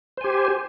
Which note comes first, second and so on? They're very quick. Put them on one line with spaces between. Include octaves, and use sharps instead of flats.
C5 G#5 G4